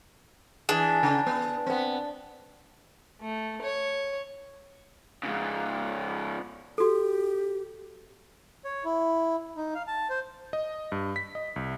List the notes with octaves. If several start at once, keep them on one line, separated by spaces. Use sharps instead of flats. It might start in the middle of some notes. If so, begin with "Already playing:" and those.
E3 D4 G#4
C#3
B3
B3 C4
A3
C#5
G#2 C#3
F#4 G4 A4
C#5
E4
D#4
F5
A5
C5
D#5
G2
B6
D#5
C2